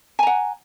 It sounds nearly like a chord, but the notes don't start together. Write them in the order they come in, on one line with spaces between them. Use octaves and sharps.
G#5 A#5 F#5